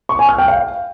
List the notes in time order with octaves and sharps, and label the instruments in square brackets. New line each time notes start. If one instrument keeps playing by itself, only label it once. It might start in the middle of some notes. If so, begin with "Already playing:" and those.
[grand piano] C#6
G#5
F6
G5
F5